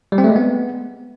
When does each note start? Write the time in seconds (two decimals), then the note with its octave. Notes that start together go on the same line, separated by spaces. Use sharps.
0.12 G3
0.18 C4
0.24 A3
0.30 G#3
0.36 B3